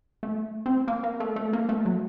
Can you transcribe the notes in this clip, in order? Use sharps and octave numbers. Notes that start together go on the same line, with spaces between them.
A3
C4
A#3
A#3
A3
A3
A#3
A3
F#3